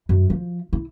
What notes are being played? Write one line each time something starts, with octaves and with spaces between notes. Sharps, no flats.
F#2
F3
E4